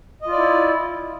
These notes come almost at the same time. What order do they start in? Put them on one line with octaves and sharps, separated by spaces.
D#5 F4 D5 E4